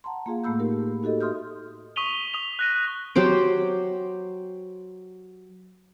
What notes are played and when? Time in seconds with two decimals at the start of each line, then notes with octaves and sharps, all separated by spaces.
0.04 F#5 A5 A#5 C6
0.26 A#3 F4 G#4 F5
0.44 A2 A3 A#3 B5 E6 G6
0.60 D#4 G4 A#4
1.03 D#4 F#4 G4 A4 D#5
1.21 A4 E5 C6 D#6 F6 G6
1.96 C#6 D#6 B6 D#7 F7 G7
2.14 G7
2.34 D#6 F7
2.59 F#6 A#6 D#7
3.16 F#3 G4 C5 G5